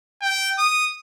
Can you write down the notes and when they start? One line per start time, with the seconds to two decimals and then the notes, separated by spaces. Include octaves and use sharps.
0.22 G5
0.58 D#6